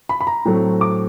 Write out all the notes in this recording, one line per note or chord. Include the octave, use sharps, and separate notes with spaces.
B5
B5
A#5
A2 F#3 A3 C4
D6